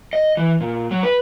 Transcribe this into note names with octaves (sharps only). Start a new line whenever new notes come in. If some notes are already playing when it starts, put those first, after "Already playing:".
D#5
E3
A#2
F#3
B4